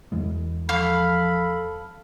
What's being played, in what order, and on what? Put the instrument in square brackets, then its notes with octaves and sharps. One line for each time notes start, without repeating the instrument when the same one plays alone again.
[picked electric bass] E2 E3 G#3
[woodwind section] F3 B5 [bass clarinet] A4 [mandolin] F5